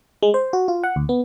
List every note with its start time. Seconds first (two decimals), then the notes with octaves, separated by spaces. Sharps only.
0.23 G#3
0.34 C5
0.53 F#4
0.68 F4
0.83 F#5
0.96 D2
1.09 B3